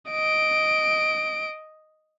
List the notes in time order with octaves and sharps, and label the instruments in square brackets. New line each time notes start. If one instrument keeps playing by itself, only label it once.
[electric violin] D#5 D7